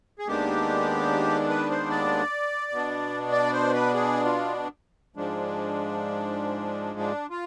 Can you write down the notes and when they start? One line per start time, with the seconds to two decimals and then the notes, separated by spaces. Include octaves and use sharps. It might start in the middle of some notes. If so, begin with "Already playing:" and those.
0.19 G#4
0.27 D#2 D#3 G#3 B3 D4 G4
1.50 B4
1.71 C5
1.90 D5
2.72 B2 B3 D4
3.32 D5
3.53 C5
3.73 B4
3.94 G#4
4.25 F4
5.16 G#2 F3 G#3 D4
6.99 D4
7.30 F4